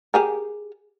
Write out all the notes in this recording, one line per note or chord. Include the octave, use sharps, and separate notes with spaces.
G4 G#4 A#4